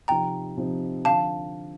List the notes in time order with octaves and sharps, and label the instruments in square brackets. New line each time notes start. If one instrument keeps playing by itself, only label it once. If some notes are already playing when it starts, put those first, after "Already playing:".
[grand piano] C3 F3 C4 D#4 [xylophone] G5 A#5
[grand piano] C3 F3 C4 D#4
[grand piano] D3 F3 [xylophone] F5 A5